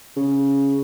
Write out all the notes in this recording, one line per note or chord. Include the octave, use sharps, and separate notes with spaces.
C#3